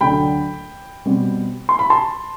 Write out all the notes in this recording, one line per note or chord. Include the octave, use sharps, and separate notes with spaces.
D2 D3 F#3 G5 B5
B2 G3 C4
C6
B5
A5 C6